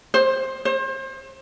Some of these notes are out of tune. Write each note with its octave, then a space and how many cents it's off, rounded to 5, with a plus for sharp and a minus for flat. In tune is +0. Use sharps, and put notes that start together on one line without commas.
C5 +20
C5 +35